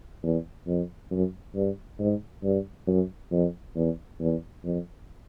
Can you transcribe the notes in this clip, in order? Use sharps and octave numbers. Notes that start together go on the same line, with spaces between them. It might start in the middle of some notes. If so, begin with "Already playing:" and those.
E2
F2
F#2
G2
G#2
G2
F#2
F2
E2
E2
F2